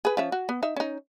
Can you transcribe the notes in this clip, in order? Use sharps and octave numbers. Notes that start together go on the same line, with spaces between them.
G#4 B4
F3 C#4 E5
F#4
B3
D#4 E5
C#4 D#4